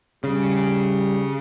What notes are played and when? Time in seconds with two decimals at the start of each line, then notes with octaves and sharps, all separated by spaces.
0.24 C#3 G3